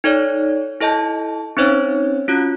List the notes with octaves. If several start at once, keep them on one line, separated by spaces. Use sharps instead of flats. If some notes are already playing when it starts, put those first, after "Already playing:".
D#4 A4 C#5 D5
E4 A4 D#5 A5 G6
C4 C#4 D#4 C5 C#5
C#4 F4 F#4